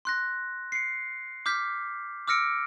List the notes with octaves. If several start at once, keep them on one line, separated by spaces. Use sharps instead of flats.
C6 F#6 A#6
C7 C#7
D6 F6 G6 B6
D6 E6 F6 A#6 C#7 D7